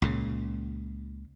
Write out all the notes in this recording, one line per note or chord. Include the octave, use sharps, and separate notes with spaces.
C#2 A#2 C#3